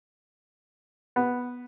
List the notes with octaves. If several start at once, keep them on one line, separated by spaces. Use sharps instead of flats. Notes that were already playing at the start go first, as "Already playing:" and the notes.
B3